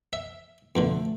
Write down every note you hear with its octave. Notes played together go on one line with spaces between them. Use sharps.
E5
F2 B2 D3 A3